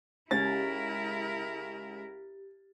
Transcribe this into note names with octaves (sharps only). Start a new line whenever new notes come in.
C#2 C#4 E4 G4 A#4 A6